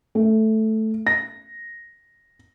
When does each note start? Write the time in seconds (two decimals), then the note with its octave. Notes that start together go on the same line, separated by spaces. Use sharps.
0.15 A3
1.07 A#6